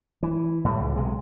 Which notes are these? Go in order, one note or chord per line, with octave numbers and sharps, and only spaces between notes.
E3
A2 G3
C#2
B1 C3 G#3